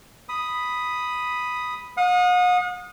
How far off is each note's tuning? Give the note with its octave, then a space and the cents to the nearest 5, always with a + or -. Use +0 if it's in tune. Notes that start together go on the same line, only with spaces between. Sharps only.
B5 +0 D#6 +0
F#5 -45 D#6 -10